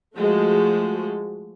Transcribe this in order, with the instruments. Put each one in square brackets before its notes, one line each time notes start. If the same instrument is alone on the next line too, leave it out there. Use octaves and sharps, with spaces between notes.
[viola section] F3 G#3 A3 F#4